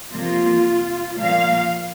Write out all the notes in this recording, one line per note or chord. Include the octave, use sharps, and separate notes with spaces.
F2 C3 F3 A#3 F4
A#2 F3 A#3 F5